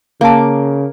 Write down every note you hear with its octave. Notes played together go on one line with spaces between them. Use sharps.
C#3 A#3 F5 A5 D6